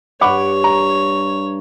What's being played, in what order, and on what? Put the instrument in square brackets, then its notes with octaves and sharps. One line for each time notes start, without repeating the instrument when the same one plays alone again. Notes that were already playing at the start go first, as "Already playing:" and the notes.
[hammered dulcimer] G2 [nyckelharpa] C#5 [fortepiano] F#5 B5 D6
[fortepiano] A#5